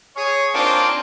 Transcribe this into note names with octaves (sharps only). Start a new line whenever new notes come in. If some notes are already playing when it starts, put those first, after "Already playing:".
G#4 C#5
A#3 C4 D4 D#4 F4